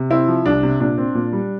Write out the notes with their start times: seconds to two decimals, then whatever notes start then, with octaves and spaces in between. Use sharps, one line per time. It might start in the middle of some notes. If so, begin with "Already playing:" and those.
Already playing: C3
0.10 C4 E4
0.28 F3
0.46 C2 D4
0.63 C3
0.80 A#2 D4
0.98 C4
1.15 A#2
1.33 G3